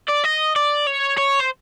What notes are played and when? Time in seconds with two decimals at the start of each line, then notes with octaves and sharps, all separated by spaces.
0.09 D5
0.25 D#5
0.56 D5
0.87 C#5
1.18 C#5
1.41 C5